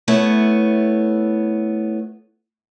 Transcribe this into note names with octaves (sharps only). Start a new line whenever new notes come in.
A3 B3 E4 C#5